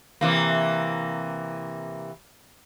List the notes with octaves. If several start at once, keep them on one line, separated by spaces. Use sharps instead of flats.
C3 E3 A#3